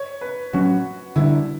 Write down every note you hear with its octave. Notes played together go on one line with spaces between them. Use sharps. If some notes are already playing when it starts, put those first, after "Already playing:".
Already playing: C#5
B4
A2 F#3 C#4 F#4
D3 G3 D4 E4